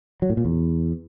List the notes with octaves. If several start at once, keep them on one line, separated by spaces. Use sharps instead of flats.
F#3
A2
A#2
E2